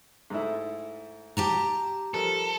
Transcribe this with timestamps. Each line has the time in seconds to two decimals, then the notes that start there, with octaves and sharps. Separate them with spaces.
0.30 G#2 A3 E4
1.37 G4 A5 A#5
2.14 F3 G3 A4 A#4